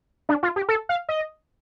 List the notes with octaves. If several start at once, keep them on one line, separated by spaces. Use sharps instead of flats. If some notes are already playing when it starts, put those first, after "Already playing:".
D4
F4
G4
A4
F5
D#5